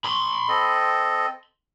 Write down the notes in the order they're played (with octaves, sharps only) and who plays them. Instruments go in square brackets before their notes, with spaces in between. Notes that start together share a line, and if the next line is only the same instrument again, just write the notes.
[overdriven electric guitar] B5 C6
[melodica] C4 A4 D#5